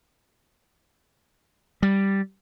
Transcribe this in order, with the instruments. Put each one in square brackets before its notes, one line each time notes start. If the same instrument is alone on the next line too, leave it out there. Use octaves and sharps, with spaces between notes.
[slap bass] G3